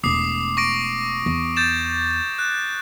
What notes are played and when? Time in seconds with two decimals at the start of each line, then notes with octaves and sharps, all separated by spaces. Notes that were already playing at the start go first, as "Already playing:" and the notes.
0.04 E1 A3 D6 D#6 C7
0.57 C#6 A#6 D7
1.26 E2
1.56 G6 A6 E7
2.39 F#6